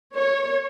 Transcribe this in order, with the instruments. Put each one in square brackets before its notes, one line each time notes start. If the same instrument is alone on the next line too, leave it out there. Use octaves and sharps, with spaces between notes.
[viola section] C#5